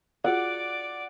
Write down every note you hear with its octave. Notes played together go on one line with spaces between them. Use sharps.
F4 F#4 G#4 D5 F#5 D6